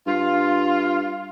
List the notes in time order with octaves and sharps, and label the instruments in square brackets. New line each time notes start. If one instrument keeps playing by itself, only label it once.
[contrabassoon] G2 [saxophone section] F4